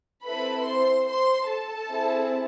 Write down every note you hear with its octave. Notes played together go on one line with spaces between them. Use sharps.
C4 E4 A4 B4 B5
C5 C6
C5 C6
A4 A5
C4 E4 G#4